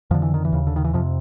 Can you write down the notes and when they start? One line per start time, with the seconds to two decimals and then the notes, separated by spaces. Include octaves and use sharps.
0.11 F2 D3 F3
0.22 E3
0.34 D#3
0.45 E3
0.52 D#2 C#3
0.67 D3
0.76 D#3
0.84 E3
0.93 F2 C3 F3